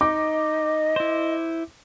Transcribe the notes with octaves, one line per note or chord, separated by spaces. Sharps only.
D#4 D#5 D6
E4 C5